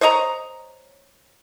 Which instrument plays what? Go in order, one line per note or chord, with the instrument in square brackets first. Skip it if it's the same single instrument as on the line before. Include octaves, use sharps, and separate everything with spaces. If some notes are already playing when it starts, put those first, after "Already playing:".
[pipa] C5 C#5 D#5 A#5